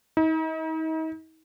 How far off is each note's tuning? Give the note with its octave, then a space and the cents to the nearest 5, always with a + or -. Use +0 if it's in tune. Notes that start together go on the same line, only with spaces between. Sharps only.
D#4 +40